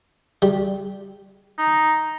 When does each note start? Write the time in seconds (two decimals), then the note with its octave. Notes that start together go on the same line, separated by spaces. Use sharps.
0.42 G3
1.58 D#4